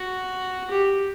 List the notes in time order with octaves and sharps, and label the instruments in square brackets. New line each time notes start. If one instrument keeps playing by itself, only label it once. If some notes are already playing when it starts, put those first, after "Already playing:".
Already playing: [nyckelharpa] F#4
G4